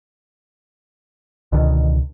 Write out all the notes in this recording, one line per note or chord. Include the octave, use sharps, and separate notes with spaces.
C#2 B2 D3 D#3